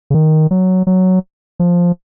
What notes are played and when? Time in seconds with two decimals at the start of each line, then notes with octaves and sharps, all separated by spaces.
0.10 C#3
0.14 D#3
0.51 F#3
0.87 F#3
1.60 F3